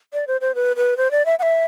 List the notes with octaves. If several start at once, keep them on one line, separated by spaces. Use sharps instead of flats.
D5
C5
C5
B4
B4
C5
D5
E5
F#5
E5